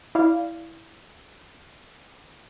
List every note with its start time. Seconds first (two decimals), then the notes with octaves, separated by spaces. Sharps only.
0.15 E4 D5 F5